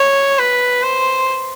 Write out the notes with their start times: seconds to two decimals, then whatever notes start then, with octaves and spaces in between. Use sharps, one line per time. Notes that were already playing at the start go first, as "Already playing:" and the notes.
Already playing: C#5
0.39 B4
0.83 C5